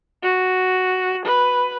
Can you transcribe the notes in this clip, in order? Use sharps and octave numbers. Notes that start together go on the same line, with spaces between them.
F#4
B4